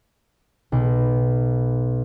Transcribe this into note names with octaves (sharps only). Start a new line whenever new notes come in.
B1